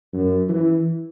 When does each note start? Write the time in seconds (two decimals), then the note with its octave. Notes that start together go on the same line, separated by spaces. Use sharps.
0.13 F#2
0.49 E3